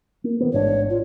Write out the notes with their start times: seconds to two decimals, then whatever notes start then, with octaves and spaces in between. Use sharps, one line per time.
0.24 A#3
0.40 D#3 E3 B3
0.52 A1 G#2 D4 C#5
0.89 F4